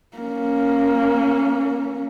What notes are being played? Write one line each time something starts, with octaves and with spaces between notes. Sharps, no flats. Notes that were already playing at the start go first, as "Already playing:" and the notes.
A#3 C#4